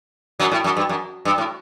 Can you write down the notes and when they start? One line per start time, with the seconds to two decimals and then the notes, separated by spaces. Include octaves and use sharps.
0.40 F#2 F#3
0.52 A2
0.64 F#2
0.77 G2
0.89 F#2
1.25 G2
1.38 A2